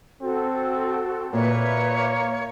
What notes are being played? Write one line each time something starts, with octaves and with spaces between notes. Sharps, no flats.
C4 F#4 A4
A#2 A#3 B4 C#5 E5